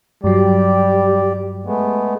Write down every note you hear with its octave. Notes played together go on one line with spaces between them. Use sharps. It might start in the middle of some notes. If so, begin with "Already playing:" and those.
G2 F#3 G3 G4 D5
G#3 A3 B3